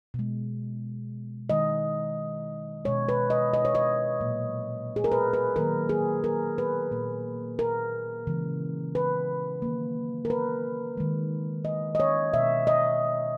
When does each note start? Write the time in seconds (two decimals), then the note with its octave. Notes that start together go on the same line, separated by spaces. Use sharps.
0.14 B2 G#3
1.50 D#3 G#3 D#5
2.85 B2 G#3 C#5
3.09 B4
3.30 D#5
3.54 D#5
3.65 C#5
3.75 D#5
4.21 A#2 F#3 A#3
4.96 G#4
5.04 A#4
5.12 B4
5.33 B4
5.56 D#3 F#3 A#3 A#4
5.89 G#4
6.24 A#4
6.58 B4
6.92 A#2 A#3
7.59 A#4
8.27 C#3 E3 G#3
8.95 B4
9.62 D#3 F#3 A#3
10.25 A#4
10.30 B4
10.97 D#3 G#3
11.65 D#5
11.95 D#5
12.00 C#5
12.33 B2 G#3 E5
12.67 D#5